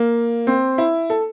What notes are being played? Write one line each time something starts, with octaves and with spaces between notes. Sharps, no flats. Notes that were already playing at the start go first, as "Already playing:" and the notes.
Already playing: A#3
C4
E4
A4